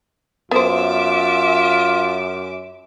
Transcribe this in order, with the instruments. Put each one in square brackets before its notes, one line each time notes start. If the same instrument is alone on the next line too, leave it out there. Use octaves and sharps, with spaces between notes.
[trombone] F#2 [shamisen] B3 C5 [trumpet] F4 [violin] E5 D6